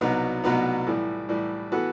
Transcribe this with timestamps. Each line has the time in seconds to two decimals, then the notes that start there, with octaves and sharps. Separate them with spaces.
0.01 C2 B2 F#3 B3 D#4
0.44 C2 B2 F#3 B3 D#4
0.87 A2 E3 G3
1.29 A2 E3 G3
1.72 E3 B3 F#4 A4